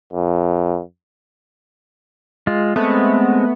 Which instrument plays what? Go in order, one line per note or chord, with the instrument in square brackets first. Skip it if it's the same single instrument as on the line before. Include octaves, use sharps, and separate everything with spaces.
[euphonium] F2
[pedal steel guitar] G#3 F4
[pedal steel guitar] G#3 C4 [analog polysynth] A3 B3